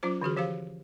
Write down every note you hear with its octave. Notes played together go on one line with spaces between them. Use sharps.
F#3 C#4 F4 C5
D3 E3 F#4 G#4
F3 G4 C5 F5